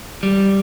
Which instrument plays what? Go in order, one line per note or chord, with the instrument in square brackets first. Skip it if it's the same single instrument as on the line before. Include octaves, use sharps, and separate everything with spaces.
[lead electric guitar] G3